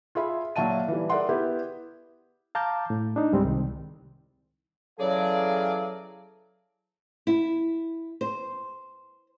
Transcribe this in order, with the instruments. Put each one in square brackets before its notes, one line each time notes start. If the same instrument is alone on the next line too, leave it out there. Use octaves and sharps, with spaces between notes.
[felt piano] F4 G#4 E5 B5
A#2 F#3 E5 A5 D#7
E3 G3
G#4 A#4 D5 E5 F#5 C6
B3 E4 G4
[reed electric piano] F5 A5 A#5 D6 G6
A2
D4 D#4
C#2 G#2 G3 G#3 C4
C2 D#3
[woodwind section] C#3 E3 F#3 [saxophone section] G#4 D5 [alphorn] A4 [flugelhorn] F5
[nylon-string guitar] E4
C5